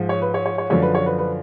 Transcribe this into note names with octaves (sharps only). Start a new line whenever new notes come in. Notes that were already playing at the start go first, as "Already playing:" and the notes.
Already playing: G#2 F3
C#5
B4
C#5
C#5
C#5
F#2 D3 F3 C#5
B4
C#5
B4
B4